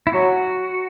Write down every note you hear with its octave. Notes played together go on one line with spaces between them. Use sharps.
E4
F#3 F#4